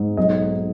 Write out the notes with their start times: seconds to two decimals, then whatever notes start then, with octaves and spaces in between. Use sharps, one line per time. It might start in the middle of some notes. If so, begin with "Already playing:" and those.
Already playing: G#2
0.17 B1 D#5